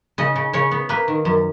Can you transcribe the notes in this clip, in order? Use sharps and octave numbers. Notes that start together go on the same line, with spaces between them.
C#3 D#5
C#3
C#3 C#5
B3
A#3 B4
D#3
F#2